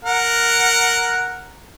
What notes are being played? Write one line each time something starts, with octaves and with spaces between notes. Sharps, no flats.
A#4 F#5